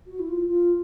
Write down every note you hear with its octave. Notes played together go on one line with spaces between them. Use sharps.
F#4
E4
F4
F4